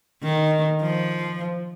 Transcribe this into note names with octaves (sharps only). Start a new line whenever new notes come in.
D#3
F3